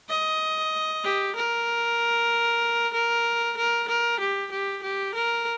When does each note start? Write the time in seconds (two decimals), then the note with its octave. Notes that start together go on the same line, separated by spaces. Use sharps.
0.09 D#5
1.04 G4
1.36 A#4
2.94 A#4
3.57 A#4
3.88 A#4
4.20 G4
4.52 G4
4.83 G4
5.15 A#4